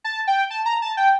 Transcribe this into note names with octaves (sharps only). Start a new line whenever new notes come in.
A5
G5
A5
A#5
A5
G5